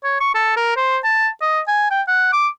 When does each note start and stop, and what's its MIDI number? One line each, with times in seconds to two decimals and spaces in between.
0.04 0.17 73
0.20 0.34 85
0.34 0.53 69
0.56 0.74 70
0.77 0.98 72
1.04 1.28 81
1.41 1.60 75
1.68 1.88 80
1.91 2.02 79
2.08 2.31 78
2.33 2.48 86